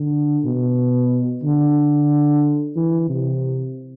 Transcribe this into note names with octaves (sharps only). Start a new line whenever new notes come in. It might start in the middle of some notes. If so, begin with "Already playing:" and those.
Already playing: D3
B2
D3
E3
C3